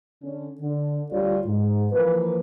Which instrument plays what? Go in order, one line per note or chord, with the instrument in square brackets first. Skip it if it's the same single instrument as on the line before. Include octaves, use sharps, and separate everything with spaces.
[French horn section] D3 C#4
D3
D2 D3 G3 F4 C#5 D5
G#2
E3 F3 A#3 B4